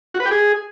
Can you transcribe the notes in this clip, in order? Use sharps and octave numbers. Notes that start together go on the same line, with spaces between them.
F#4
B4
G4
G#4